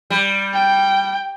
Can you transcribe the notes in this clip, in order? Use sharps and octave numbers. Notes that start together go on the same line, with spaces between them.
G3
G5